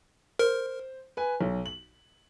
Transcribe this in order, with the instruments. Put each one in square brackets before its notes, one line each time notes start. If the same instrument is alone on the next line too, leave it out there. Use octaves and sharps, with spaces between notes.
[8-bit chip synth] A#4 [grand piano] C5
[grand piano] B4 G#5
B1
F#7